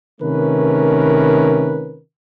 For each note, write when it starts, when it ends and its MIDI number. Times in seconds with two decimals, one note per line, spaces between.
0.21 1.99 48
0.21 1.99 51
0.21 1.99 57
0.21 1.99 61
0.21 1.99 70
0.21 1.99 71